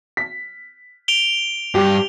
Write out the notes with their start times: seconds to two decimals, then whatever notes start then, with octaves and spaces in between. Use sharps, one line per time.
0.17 B6
1.08 D7 F7 G7
1.75 G2 G4